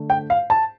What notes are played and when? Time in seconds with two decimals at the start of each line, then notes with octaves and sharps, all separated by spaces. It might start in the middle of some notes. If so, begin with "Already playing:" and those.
Already playing: D3 A3
0.10 G5
0.30 F5
0.50 A5